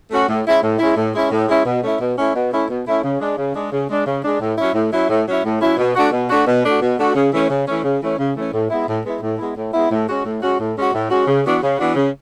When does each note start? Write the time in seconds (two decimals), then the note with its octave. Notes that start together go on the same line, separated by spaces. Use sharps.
0.10 A3 C#4 F#4
0.28 A2
0.45 G#3 C#4 E4
0.62 A2
0.79 G#3 C#4 E4
0.96 A2
1.13 G#3 C#4 E4
1.30 A2
1.48 G#3 C#4 E4
1.65 B2
1.82 A3 C#4 E4
1.99 B2
2.16 A3 C#4 E4
2.34 B2
2.51 A3 C#4 E4
2.68 B2
2.85 A3 C#4 E4
3.03 C#3
3.20 G#3 D4
3.37 C#3
3.54 G#3 D4
3.71 C#3
3.88 G#3 D4
4.05 C#3
4.23 G#3 D4
4.40 A2
4.57 F#3 C#4 E4
4.74 A2
4.91 F#3 C#4 E4
5.09 A2
5.26 F#3 C#4 E4
5.43 A2
5.60 F#3 C#4 E4
5.77 B2
5.95 A3 D4 F#4
6.11 B2
6.29 A3 D4 F#4
6.47 B2
6.63 A3 D4 F#4
6.80 B2
6.98 A3 D4 F#4
7.14 C#3
7.32 E3 A3 C#4
7.49 C#3
7.66 E3 A3 C#4
7.83 C#3
8.01 E3 A3 C#4
8.18 C#3
8.35 E3 A3 C#4
8.52 A2
8.69 G#3 B3 E4
8.87 A2
9.04 G#3 B3 E4
9.21 A2
9.38 G#3 B3 E4
9.56 A2
9.73 G#3 B3 E4
9.90 A2
10.07 G#3 C#4 F#4
10.24 A2
10.41 G#3 C#4 F#4
10.59 A2
10.76 G#3 C#4 F#4
10.93 A2
11.10 G#3 C#4 F#4
11.27 C#3
11.44 E3 B3 D4 F#4
11.62 C#3
11.79 E3 B3 D4 F#4
11.95 C#3